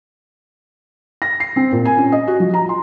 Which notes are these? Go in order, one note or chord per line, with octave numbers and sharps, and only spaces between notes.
A#6
C7
C4
A#2
G#5
C#4
D#5
F#4
F3
A#5
C6